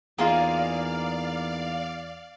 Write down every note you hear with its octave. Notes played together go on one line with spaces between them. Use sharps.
E2 A#3 D#4 F4 G#4 D5 F5 G#5